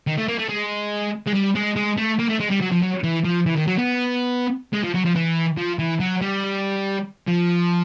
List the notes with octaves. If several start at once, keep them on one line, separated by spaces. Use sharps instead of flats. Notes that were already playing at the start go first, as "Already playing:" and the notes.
D#3
A3
A#3
A3
G#3
G#3
G3
G#3
G#3
A3
A#3
A3
G#3
G3
F#3
F3
F#3
E3
F3
E3
D#3
F#3
B3
G#3
F3
F#3
F3
E3
F3
E3
F#3
G3
F3